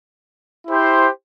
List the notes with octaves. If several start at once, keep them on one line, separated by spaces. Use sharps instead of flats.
E4 G4 C5